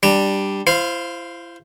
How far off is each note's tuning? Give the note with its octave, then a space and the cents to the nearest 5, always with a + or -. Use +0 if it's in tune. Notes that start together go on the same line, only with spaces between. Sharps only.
G3 +0 D4 +5 A#5 -35
E4 +40 C5 +0 F5 +0